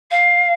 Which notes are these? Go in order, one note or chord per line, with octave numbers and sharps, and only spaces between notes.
F5